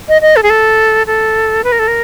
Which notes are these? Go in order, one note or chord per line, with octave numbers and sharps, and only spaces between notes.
D#5
D#5
A4
G#4
A4
A4
B4
A#4
A4
A#4